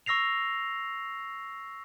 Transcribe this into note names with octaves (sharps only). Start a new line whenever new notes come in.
C#6 E6 A#6 C7 F7